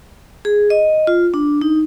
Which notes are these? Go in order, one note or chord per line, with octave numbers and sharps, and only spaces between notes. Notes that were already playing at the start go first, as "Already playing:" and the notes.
G#4
D#5
F4
D4
D#4